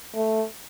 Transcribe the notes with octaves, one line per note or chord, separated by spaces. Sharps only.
A3